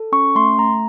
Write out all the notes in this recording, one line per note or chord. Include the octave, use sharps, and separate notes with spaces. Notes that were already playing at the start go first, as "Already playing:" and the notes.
Already playing: A4
C#4 C#6
A3 C6
A3 A#5